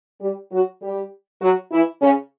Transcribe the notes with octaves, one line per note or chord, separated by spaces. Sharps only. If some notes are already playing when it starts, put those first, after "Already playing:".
G3 G4
F#3 F#4
G3 G4
F#3 F#4
E3 E4
C#3 C#4